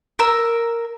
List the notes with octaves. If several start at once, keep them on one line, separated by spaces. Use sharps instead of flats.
A#4 E6